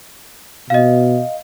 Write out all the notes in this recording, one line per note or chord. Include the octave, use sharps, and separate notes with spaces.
B2 D#5 F5